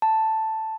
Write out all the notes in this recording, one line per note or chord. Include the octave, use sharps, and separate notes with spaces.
A5